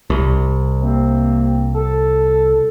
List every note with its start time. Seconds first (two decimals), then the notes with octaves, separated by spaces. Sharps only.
0.10 C2
0.81 C3 A#3 C4
1.75 A4